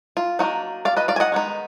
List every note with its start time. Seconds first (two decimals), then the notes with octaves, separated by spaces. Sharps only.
0.17 F4
0.39 F#3 A#3 D4 D#4 F#4
0.85 D5 F5
0.97 B4 D#5
1.08 D5 F5
1.16 G#5
1.20 D#5 F#5
1.32 D#3 G#3 B3 D#4